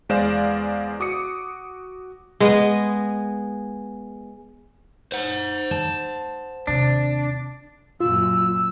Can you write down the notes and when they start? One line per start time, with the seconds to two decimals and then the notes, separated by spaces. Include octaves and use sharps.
0.09 E2 G#3 C5 D5 F5 E7
1.00 F#4 D6 D#6 C#7
2.40 G#3 B3 G#4 D#5
5.12 C5 F#5
5.71 A5
6.67 D#2 C3 D4
8.01 F#2 A#2 F4 E6